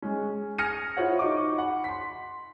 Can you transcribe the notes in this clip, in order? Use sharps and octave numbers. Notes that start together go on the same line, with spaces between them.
G#3 C#4
D#6 F6 G#6 A#6 C#7 D#7
E4 F4 C5 C#5 F#5
D#4 F#4 D#5 C#6 D6
F#5 B5
C6 B6